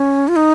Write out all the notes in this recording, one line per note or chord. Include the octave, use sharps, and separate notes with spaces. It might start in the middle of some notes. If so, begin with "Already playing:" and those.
Already playing: C#4
F4
D#4